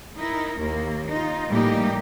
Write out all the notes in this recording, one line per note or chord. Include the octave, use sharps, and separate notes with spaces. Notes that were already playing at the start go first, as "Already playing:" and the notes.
D#4 E4 A#4
D#2 A#3
D#4 F4
A2 E3 G3 A#3 D#4 G4